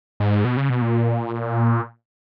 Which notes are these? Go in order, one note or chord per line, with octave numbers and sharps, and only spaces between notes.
G#2
B2
C#3
B2
A#2